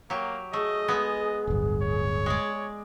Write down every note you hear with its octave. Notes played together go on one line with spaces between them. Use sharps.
F#3 A#3 G4
A3 G#4 D#5
G#3 B3
D1 G1
C#5
G#3 D5